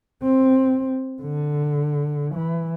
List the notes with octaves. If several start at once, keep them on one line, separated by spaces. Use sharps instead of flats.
C4
D3
E3